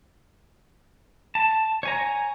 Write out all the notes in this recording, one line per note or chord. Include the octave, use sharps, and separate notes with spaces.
A5
C#5 G#5 A#5